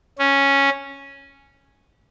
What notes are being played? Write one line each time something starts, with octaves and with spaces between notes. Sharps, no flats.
C#4